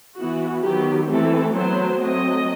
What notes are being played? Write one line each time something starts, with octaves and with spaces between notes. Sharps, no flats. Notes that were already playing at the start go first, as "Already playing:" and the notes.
E3 B3 F#4
D#3 F#3 B3 G4
E3 A3 C4 A4
F#3 B3 C5
F#3 A3 C4 D#5